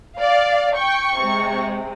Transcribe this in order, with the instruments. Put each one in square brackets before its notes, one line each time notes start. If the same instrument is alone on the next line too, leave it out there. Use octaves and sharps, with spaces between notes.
[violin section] D5 [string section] F5
[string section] G5 G6 [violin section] C#6
[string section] C3 G#3